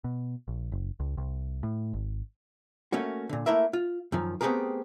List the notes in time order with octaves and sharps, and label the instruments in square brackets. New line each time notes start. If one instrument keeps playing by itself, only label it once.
[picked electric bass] B2
A#1
F#1
C#2
C2
A2
G#1
[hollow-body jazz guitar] A3 A#3 C#4 F#4
A#2 D3
A3 A#3 E4 A#4 E5
F4
F#2 D#3 F3
A3 B3 C4 G4 G#4 A#4